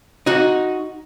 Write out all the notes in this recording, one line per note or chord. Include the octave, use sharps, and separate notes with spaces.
D#4 F#4